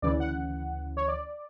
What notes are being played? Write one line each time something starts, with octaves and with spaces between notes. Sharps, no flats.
D2 C#3 E3 D5
F#5
C#5
D5